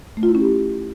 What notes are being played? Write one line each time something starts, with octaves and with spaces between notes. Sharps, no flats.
A3
F4
E4
C#4
G4